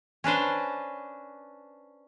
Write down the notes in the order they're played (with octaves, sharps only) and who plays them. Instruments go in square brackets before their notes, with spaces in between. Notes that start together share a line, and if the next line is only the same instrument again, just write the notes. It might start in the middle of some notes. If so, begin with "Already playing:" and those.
[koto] C#4 D4 B4 C5